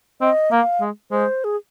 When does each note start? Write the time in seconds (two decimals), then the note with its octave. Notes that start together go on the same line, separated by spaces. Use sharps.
0.21 C4 D#5
0.52 A#3 F5
0.81 G#3
1.11 G#3 C5
1.44 G#4